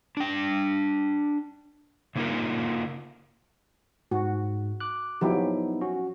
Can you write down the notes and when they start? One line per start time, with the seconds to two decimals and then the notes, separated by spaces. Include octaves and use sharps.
0.17 D4 G5
2.16 C#3 A#3 D#4 F4 A#4
4.11 G#2 F#4
4.80 D6 F#6
5.21 F3 F#3 B3 D#4 E4 G4
5.81 C#4 F#4